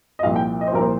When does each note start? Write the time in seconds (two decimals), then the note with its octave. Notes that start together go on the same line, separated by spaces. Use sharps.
0.19 D#5
0.23 C2 A#2 F3 F5
0.36 G5
0.61 D#5
0.68 C5
0.73 C2 A#2 F3 A#4
0.81 C5